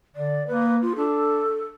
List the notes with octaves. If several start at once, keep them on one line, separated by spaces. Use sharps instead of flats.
D3 D5
A#3 B4
F4
D4 A4